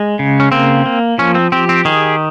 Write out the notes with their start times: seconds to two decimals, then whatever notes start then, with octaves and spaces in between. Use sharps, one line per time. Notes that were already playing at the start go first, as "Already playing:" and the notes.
Already playing: G#3
0.19 C#3
0.40 C#4
0.52 A#3 C4
0.86 A#3
1.18 F3 C#4
1.35 C4
1.52 C4 G4
1.69 C4
1.85 D#3 G#4